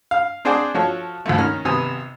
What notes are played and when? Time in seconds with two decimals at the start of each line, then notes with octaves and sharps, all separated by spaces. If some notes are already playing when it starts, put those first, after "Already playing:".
0.11 F5
0.45 C4 D4 G#4 C5 D5 F#5
0.74 F3 F#4 A4 C#5
1.26 D2 F3 A3
1.38 D#3 C#4 A#5 F6
1.65 G#1 C3 B3 G#5 D#6